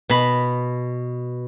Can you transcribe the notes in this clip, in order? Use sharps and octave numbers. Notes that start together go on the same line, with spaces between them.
B2 B5